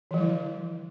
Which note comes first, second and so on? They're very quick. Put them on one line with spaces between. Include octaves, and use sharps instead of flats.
E3 F3 G3 E4 D3